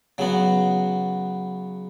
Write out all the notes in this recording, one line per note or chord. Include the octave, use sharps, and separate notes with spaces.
C#3 F#3 B3 F#4